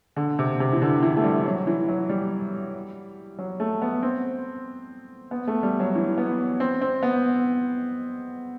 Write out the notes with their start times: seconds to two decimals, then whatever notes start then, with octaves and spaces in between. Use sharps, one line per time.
0.17 D3
0.39 C3
0.60 C3
0.73 E3
0.82 D3
1.03 E3
1.17 A3
1.24 G3
1.46 F#3
1.67 E3
1.89 F#3
2.09 G3
3.38 F#3
3.60 A3
3.82 B3
4.02 C4
5.31 B3
5.47 A3
5.63 G3
5.80 F#3
5.95 E3
6.18 B3
6.60 C4
6.81 C4
7.03 B3